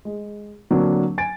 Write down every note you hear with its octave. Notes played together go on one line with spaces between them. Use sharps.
G#3
D3 F#3 A#3 C4 D4
G#5 A6 D7